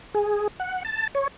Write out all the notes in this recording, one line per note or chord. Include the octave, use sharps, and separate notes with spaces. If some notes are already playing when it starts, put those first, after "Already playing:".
G#4
F#5
A5
C#5